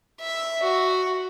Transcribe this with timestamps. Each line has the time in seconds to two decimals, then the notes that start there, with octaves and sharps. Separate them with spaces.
0.21 E5
0.63 F#4